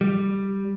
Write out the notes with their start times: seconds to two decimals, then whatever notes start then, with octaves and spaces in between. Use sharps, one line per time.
0.01 G3